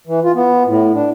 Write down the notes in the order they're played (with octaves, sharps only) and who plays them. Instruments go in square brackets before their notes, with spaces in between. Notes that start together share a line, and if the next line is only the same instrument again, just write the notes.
[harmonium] E3
F4
B3
A2
D4